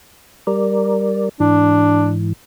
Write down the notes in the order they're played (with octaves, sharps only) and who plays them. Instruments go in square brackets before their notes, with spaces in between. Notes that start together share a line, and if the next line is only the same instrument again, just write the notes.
[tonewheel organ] G3 A#4 D5
[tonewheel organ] G#2 E3 [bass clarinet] D4